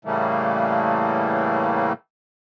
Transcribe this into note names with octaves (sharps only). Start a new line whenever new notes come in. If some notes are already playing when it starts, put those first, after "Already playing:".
A2 C#3 E3 G3 A3 A#3